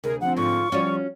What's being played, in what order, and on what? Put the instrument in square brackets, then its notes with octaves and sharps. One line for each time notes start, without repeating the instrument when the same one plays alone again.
[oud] D2 [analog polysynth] C3 G#4 [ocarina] A#4
[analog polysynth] F3 C4 [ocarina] F#5
[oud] G#2 D3 [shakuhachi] F4 [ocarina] C#6
[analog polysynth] F3 G3 [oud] C#4 F4 F#4 [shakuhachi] D5